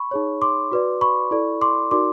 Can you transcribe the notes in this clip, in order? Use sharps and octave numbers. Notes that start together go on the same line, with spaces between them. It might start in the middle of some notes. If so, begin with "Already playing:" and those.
Already playing: B5 C#6
D#4 G#4 C#5
C6 D6
F#4 B4 D5
B5 C#6
E4 A4 D5
C6 D6
D#4 F#4 A#4 D5 C6 D6